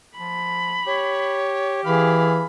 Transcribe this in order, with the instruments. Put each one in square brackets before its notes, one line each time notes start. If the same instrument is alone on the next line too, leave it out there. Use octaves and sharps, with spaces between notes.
[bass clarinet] F3 [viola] B5
[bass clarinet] G4 [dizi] C#5
[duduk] E3 [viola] G#4 F5 [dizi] B5